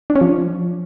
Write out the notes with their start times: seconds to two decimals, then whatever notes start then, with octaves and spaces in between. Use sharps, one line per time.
0.10 D4
0.16 C#4
0.21 F3